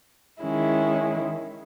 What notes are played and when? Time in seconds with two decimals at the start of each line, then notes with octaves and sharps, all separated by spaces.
0.42 D#3 G#3 C#4 E4